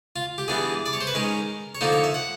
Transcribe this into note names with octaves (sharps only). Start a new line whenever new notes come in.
F4
G4
E3 G3 B3 D4 G#4
D5
C#5
C5
B4
D#3 G#3 C#4 A#4
C#5
D3 F3 A#3 D#4 C5
C#5
E5
F#5